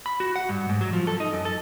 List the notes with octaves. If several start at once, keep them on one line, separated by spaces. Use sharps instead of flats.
B5
F#4
F#5
G2
G#2
F#3
F3
A4
D#4
F#2
A4